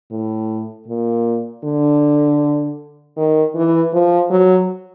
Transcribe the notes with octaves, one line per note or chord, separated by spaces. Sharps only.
A2
A#2
D3
D#3
E3
F3
F#3